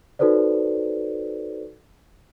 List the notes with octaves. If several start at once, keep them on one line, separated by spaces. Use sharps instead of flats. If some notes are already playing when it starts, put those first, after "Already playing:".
D#4 F#4 A4 B4 C5 D5